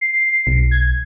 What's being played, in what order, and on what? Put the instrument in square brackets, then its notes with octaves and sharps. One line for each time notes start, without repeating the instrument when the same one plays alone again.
[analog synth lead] C7
[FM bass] B1
[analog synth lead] G#6